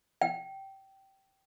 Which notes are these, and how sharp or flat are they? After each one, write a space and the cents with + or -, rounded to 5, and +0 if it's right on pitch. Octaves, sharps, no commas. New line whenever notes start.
G5 -20